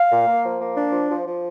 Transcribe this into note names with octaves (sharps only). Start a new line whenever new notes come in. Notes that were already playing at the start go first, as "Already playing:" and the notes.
Already playing: F5
A#2
A#3
F3
A#3
D4
F3
F3
F3